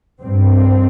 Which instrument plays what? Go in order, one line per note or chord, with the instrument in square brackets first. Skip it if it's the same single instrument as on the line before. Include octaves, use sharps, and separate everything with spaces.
[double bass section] G2 C4